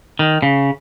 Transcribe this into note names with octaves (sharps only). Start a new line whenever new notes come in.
D#3
C#3